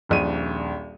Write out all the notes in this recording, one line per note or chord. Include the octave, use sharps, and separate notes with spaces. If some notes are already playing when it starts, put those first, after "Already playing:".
D#1 A#1 D#7